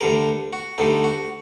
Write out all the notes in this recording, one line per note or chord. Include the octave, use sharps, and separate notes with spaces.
D2 D3 G3 A#4
F#4
D2 D3 G3 D#4
F#4